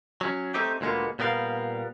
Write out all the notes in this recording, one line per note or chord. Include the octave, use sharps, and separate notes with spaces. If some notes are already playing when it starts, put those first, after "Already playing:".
F#3 C#4
A3 C4 D#4 G4
D2 A#2 G#3 A#3 B3
A#2 G3 B3 A#4 F5